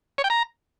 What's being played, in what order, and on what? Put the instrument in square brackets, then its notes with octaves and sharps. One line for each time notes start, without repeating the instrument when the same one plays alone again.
[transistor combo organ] C#5
G5
A#5